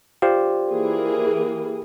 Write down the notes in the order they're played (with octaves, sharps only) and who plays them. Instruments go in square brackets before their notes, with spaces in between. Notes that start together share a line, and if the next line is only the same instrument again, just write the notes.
[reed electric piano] F4 C5 D5 [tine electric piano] G4
[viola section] E3 A#3 G#4